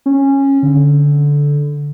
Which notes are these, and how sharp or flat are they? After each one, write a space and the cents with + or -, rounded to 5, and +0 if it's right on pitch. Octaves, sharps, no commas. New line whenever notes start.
C#4 -15
D3 -15